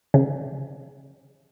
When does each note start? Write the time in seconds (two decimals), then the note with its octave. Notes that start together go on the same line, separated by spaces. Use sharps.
0.14 C#3